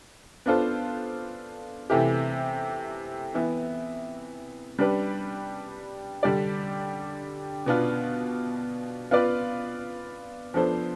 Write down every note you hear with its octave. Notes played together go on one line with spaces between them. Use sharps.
B3 D4 F4 A4 C5
C3 E3 A3 E4 G4
E3 B3 E4
G3 D4 G4 B4
D3 G3 D4 G4 D5
B2 B3 D4 F4
B3 F4 B4 D5
F3 B3 D4 A4 C5